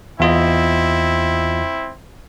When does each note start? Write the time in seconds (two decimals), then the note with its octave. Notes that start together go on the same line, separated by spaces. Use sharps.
0.20 E2 C4 E4 F4 D#5